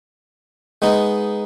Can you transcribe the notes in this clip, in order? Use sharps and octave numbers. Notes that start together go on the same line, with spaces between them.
G#3 B3 D#4